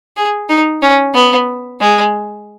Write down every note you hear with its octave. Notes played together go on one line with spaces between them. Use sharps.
G#4
D#4
C#4
B3
G#3